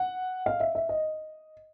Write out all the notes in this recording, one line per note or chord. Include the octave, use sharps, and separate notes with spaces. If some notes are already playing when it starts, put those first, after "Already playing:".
Already playing: F#5
F5
E5
E5
D#5